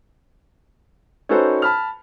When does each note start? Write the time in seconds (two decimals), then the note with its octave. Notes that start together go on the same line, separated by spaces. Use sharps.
1.29 C#4 D#4 F#4 A4 B4 C5
1.62 A5 B5 F6